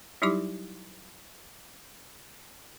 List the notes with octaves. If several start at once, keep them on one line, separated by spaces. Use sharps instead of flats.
F#3 G3 D#4 E4 G4 D6